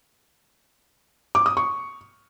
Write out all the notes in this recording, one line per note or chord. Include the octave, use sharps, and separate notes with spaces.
D6
D#6
C#6